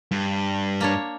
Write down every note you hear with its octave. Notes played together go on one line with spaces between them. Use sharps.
G2
A#3 D4 C#5